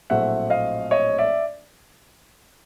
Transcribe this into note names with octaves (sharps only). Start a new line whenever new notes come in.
A#1 A2 F#3 A3 C4 E5 F#5
D#5 F5
C#5 D#5
D5 E5